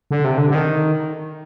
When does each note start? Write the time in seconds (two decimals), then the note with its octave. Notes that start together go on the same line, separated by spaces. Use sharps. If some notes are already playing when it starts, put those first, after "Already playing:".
0.11 D3
0.24 C3
0.38 D3
0.50 D3
0.55 D#3